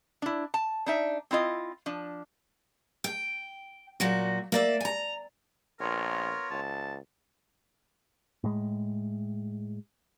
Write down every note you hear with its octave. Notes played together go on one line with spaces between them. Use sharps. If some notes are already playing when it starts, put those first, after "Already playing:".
D4 E4
A5
D4 D#4 E5
C4 E4 F4 D#5
F3 D4
G5
A#2 F#3 F#4
A#3 D5 E5
G#5 A#5
A#1 B3 F4 A#4 C#5
C#2 A5
A2 G#3